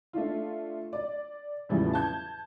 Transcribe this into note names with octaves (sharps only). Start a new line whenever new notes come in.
A3 D4 F4
D5
E2 A2 C#3 E3 F3 G3
A5 G6 G#6